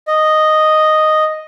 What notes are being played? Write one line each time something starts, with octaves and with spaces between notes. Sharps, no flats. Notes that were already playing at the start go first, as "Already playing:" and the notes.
D#5